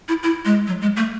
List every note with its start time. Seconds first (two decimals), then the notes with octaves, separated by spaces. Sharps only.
0.09 E4
0.23 E4
0.45 G#3
0.67 F#3
0.82 G#3
0.96 A3